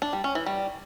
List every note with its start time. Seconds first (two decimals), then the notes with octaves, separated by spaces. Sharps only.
0.02 D4
0.13 G3
0.24 C#4
0.35 E3
0.46 G3